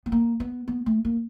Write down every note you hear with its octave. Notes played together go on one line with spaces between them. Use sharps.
B3
A#3
B3
B3
A3
A#3